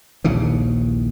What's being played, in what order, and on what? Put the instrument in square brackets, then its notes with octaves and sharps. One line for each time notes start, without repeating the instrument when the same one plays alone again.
[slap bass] A#1 D#2 C#3 E3